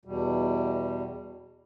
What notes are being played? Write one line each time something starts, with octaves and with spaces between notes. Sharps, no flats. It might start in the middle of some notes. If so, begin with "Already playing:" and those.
E2 B2 G3